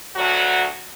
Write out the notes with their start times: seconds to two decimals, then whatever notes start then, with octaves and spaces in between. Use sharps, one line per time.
0.16 D2 F#3 F#4